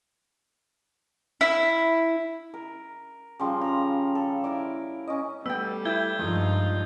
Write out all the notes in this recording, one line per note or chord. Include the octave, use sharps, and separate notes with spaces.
E4
A#4
C#3 F3 G3 F4
A#5 B5
A4
E4 A#4 D5
C#4 D#5
G3 A3 B3 G5 E6
E4 E5 G5 G6 G#6 G7
G2 F3 G#3 D#4 F4